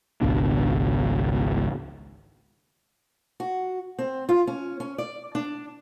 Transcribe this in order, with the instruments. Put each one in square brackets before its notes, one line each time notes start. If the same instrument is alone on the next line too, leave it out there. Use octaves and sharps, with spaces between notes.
[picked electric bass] G#1 C#2 B2 D4
[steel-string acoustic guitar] F#4
C4
F4
C#4
C#4
D5
D4